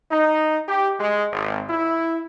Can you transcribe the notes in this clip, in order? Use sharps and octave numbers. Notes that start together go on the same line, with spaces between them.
D#4
G4
G#3
G#1
E4